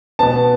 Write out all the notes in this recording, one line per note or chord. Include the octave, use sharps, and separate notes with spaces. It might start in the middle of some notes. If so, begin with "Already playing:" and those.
B2 B3 A5